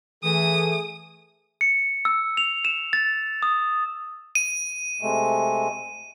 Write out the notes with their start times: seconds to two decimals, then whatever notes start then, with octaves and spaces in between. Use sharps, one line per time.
0.24 E3 A3 G#4 D#6
1.61 C#7
2.05 E6
2.37 F7
2.65 E7
2.93 A6
3.43 D#6
4.35 D#7
5.01 C3 G#3 A3